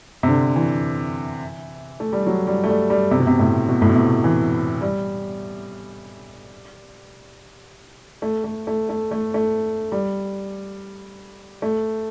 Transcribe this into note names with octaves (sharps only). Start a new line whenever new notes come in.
C3
D3
E3
A3
G3
F#3
G3
A3
G3
G3
C3
B2
C3
A2
B2
A2
B2
C3
E3
G3
A3
A3
A3
A3
A3
A3
G3
A3